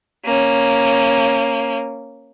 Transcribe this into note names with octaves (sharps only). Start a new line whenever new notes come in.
A#3 C#4